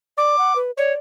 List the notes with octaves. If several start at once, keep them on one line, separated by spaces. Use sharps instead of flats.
D5 D6
F#5
B4
C#5 D5